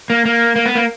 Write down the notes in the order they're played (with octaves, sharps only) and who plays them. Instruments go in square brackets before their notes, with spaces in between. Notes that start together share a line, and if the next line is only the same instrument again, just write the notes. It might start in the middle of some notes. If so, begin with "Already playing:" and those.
[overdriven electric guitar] A#3
A#3
A#3
B3
A#3